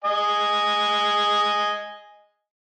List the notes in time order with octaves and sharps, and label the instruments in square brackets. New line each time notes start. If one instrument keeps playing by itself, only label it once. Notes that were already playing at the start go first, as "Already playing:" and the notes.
[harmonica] D#5 G#5